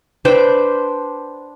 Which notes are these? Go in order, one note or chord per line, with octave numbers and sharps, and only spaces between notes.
D4 B4 C5 G5